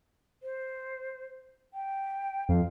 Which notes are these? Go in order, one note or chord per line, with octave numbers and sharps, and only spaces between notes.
C5
G5
F2 F5